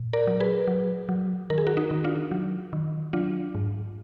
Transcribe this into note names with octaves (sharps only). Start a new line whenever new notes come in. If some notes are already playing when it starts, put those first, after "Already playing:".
Already playing: A#2
A#4 D5
F#3
G#4 B4
F#3
F#3
D#3 A#4
G#4
F#4 A#4
D#4 F#4
D#3
D4 F4
F#3
D#3
F#3 D4 F4
G#2